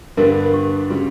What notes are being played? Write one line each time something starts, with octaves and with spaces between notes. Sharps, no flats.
G2 D3 G3 B3 D4 A#4
G4
C#3 G3 F#4